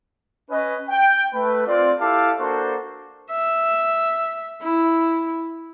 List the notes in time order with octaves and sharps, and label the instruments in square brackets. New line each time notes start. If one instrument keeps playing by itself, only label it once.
[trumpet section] C#4 B4 D#5
G5
A3 B4
C4 F4 D5
E4 G4 A4 F5 A5 D6
A#3 D4 F#4 A4 C5
[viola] E5
E4